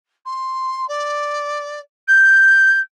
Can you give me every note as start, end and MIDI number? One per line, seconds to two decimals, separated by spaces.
0.25 0.87 84
0.88 1.80 74
2.07 2.79 91